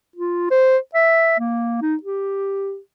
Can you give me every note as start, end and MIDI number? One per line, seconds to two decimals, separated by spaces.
0.16 0.48 65
0.51 0.77 72
0.95 1.36 76
1.39 1.81 58
1.81 1.95 63
2.02 2.78 67